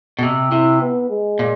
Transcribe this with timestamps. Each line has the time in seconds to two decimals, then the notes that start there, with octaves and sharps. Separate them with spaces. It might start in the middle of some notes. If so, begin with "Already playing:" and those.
0.19 B2
0.23 C3
0.51 C3 E4
0.82 B3
1.10 G#3
1.39 A#2